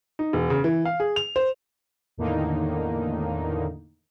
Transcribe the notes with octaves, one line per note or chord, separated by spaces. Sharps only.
D#4
E1
C#3
E3
F5
G#4
F7
C5
E2 A2 D3 D#3 A#3 D#4